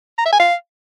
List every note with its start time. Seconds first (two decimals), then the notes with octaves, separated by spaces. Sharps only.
0.19 A#5
0.26 E5
0.33 G#5
0.40 F5